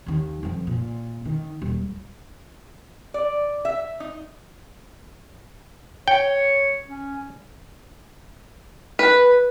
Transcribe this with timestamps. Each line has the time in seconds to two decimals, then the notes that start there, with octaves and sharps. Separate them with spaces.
0.06 D#2 D#3
0.43 F1 F2
0.67 A#2
1.25 D#3
1.62 D#1
3.14 D5
3.65 E5
4.00 D#4
6.08 C#5 G5
6.87 C#4
8.99 B4